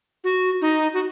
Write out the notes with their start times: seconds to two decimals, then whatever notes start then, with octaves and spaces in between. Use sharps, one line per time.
0.24 F#4
0.61 D#4
0.94 F#4